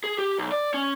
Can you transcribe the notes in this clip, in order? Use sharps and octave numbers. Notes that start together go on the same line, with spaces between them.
G#4
G4
B1
D5
C#4